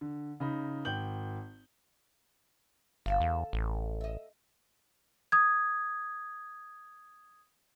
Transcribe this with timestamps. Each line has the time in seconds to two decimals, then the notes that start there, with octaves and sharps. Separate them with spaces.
0.01 D3
0.40 C#3 D#4 B5
0.85 G#1 G5 G6 F#7
3.06 G1 D2 A4 F5
3.21 E2
3.53 A1
4.01 D#5 E5
5.32 D#6 G#6